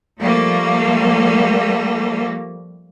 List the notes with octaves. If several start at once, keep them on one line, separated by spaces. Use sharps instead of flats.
F3 G3 A3 A#3